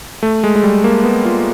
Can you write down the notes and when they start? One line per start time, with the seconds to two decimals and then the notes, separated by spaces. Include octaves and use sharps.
0.23 A3
0.44 G#3
0.56 G#3
0.64 G3
0.84 A#3
1.04 B3
1.25 F4